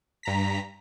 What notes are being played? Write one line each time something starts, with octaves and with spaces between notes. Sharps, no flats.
G2 A#5 B6